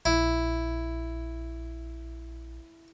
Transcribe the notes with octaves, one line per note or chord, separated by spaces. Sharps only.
A#1 E4